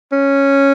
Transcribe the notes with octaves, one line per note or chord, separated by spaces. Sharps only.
C#4